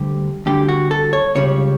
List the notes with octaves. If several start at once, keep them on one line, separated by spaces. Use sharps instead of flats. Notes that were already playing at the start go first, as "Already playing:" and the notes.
Already playing: D2 D3 G3 G4
D2 D3 G3 G4
F#4
A4
C#5
C#2 C#3 G3 C#5